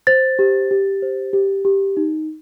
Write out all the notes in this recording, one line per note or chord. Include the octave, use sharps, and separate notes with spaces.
C5 A6
G4
G4
C5
G4
G4
D#4